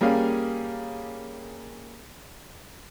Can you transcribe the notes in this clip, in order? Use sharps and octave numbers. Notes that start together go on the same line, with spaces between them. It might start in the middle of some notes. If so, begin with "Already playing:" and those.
G3 A#3 C#4 G#4 F5